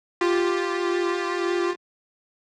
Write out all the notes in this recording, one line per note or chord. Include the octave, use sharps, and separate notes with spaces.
F4 G4